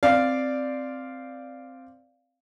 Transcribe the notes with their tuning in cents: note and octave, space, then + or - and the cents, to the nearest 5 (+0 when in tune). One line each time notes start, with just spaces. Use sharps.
C4 +0 D5 +0 F5 +0